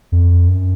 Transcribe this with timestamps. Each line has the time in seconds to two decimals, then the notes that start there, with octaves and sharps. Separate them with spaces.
0.12 F2
0.48 F#2